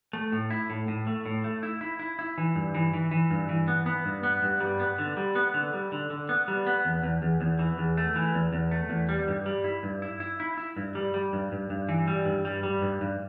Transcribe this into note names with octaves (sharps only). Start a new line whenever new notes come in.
A3
A2
E4
A2
A2
A3
A2
A3
E4
E4
E4
E4
E3
G2
E3
E3
E3
G2
E3
B3
B3
G2
B3
G2
G3
B3
D3
G3
B3
D3
G3
D3
D3
B3
G3
B3
E2
E2
E2
E2
E3
E2
A3
E3
E2
E2
A3
E2
G3
G2
G3
E4
G2
E4
E4
E4
E4
G2
G3
G3
G2
G2
G2
E3
G3
G2
G3
G3
G2
G2